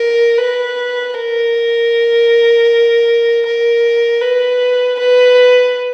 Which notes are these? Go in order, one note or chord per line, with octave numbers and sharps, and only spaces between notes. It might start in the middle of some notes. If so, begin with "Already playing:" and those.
Already playing: A#4
B4
A#4
A#4
B4
B4